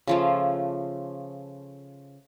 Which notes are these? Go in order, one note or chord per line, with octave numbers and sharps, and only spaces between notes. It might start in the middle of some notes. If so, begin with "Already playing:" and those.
C#3 F3 A3